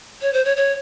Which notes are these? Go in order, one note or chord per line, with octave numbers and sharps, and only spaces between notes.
C#5
C5
C#5
C#5